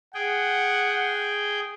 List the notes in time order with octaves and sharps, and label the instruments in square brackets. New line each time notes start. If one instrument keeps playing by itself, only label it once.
[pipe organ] G#4 G5 [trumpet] F#5